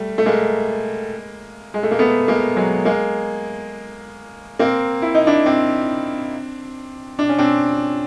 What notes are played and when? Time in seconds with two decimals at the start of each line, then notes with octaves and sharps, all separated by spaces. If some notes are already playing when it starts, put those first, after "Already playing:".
Already playing: G3 A3
0.18 A3
0.26 G#3 A#3
1.74 G#3
1.83 A3
1.91 A#3
1.99 A3 B3
2.28 G#3 A#3
2.56 F#3 G#3
2.85 G#3 A#3
4.59 A#3 C4
5.02 E4
5.14 D#4
5.26 D4 E4
5.46 C4 D4
7.19 D4
7.29 C#4
7.38 C4 D4